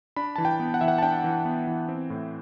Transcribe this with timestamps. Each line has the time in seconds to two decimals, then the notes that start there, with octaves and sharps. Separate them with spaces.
0.16 D4 B5
0.36 E3 A5
0.45 G5
0.60 B3
0.74 F#5
0.81 E3 E5
0.88 F#5
0.98 A5
1.02 D4 G5
1.24 E3
1.45 B3
1.67 E3
1.89 C4
2.10 A2